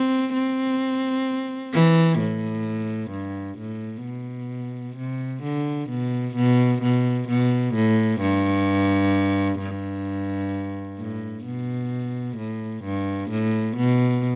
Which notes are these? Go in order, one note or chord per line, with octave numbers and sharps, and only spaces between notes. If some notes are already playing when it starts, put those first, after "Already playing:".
Already playing: C4
C4
E3
A2
G2
A2
B2
C3
D3
B2
B2
B2
B2
A2
G2
G2
A2
B2
A2
G2
A2
B2